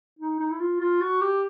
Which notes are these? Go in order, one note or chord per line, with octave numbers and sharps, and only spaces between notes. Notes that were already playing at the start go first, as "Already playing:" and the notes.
D#4
D#4
E4
F4
F4
F#4
G4